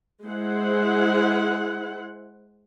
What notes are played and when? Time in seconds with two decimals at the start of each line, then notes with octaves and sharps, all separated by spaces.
0.23 G#3 E4 C5 F#5